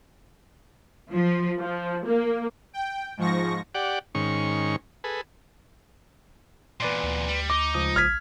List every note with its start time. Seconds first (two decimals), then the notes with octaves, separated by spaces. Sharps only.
1.12 F3
1.60 F3
2.06 A#3
2.73 G5
3.17 G#2 F3 C#6 A#6
3.75 G4 D5 F#5
4.15 G#2 D#3 C#4 C#6
5.04 G#4 A4 B4
6.80 E2 A#2 B4 D5 C6
7.03 D2
7.28 G3
7.50 D#4 D6
7.74 C#2 F3 D#6
7.96 A#1 F6 G#6 B6